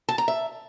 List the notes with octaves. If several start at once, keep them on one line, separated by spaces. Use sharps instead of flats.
A5
A#5
E5